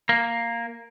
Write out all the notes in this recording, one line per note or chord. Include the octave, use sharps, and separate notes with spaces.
A#3